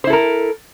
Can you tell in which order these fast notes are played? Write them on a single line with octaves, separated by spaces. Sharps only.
C5 E4 A4 A#4